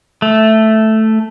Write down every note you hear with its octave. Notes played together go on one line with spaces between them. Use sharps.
A3